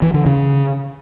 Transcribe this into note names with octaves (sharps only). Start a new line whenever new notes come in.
E3
D3
C#3